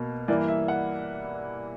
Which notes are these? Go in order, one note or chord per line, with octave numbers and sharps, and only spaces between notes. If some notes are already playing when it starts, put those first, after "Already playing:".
Already playing: B2 A#3
G2 E3 A#3 D5
E5
F#5